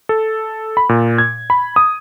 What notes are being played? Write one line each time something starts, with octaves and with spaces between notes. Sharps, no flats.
A4
B5
A#2
G#6
B5
D#6